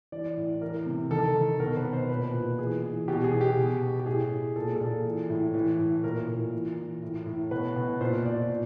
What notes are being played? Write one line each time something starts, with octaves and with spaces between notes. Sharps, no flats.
E3 D5
A2
E3 A#4
C3
D#3 A4
D#3
B2 A#4
B4
B2
C5
A#2 B4
A#2
E3 G#4
E3
B2 G4
G#4
B2
G4
B2
B2
G4
A2 G#4
A2
A#2 A4
G#4
A#2 A4
E3
A2
E3
A2
A#2 A#4
A#2 A#4
E3
E3
A2
A2
B2 B4
B2
A#2 C5
A#2 D5
A#2